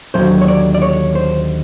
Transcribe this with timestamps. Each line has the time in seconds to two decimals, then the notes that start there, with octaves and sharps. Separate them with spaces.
0.14 D#2 D3 F#3 A3 C5
0.42 C#5
0.48 D5
0.74 D5
0.82 C#5
1.15 C5